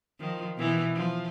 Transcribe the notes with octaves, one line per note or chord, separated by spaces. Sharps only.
D#3 F3
B2 E3 B3
F3